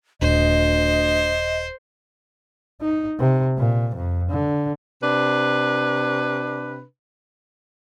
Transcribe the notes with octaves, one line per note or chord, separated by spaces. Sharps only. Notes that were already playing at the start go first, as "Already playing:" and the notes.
D#1 D2 C5 D#5
D#4
C3
A#2
F2
D3
C3 D4 B4